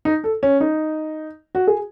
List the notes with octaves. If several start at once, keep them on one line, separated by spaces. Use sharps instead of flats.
D#4
A4
C#4
D#4
F#4
G#4